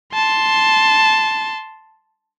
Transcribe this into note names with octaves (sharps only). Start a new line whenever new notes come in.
A5 C6